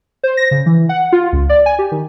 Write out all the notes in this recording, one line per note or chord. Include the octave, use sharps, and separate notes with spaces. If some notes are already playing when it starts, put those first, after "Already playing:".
C5
A#6
C#3
E3
F#5
F4
C#2
D5
G#5
G4
D#3